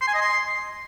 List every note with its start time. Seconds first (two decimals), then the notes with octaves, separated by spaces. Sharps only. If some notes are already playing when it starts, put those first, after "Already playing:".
0.01 C6
0.08 G#5
0.14 D#5
0.21 C6